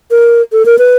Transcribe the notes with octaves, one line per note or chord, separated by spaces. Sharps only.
A#4
A4
A#4
B4